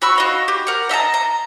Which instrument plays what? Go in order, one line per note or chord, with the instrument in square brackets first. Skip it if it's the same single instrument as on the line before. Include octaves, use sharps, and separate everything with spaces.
[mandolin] F#4 B5 C#6 E6
F#4 D#5 F5
G4
A#4 F#5
D#5 E5 A5 A#5
A#5